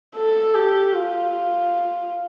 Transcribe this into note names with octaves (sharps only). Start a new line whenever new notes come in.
A4
G4
F4